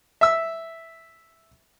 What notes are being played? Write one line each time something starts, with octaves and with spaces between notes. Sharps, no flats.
E5 E6